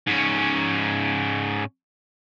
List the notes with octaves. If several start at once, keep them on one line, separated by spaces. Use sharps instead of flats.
G#2 C#4